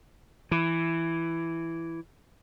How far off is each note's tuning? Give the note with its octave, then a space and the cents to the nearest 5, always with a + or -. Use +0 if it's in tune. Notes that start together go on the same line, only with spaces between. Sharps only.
E3 +5